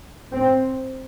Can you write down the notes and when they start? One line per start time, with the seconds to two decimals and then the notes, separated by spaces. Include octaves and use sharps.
0.32 C4